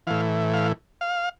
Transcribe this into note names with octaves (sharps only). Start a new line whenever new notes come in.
A2 E3 F5
F5
F5